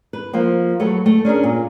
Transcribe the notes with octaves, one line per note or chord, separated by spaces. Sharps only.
B4
F3 A#3
F#3 A3 A4 B4 C#5
A3
C#4 D4 G#4 A#4
A#2